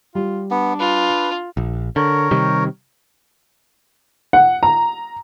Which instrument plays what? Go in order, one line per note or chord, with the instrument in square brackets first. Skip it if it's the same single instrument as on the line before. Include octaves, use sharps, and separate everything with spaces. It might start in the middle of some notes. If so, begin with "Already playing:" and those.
[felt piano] G3 [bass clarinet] F4
[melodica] B3 [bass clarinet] D4
[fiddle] F4 [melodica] B4
[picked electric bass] A#1
[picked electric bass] D3 [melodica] A#4 C#5
[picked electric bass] C3 D#3 G3
[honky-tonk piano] F#5
A#5